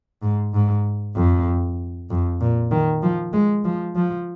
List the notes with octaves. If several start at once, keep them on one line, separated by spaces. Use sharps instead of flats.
G#2
G#2
F2
F2
A#2
D#3
F3
G#3
F3
F3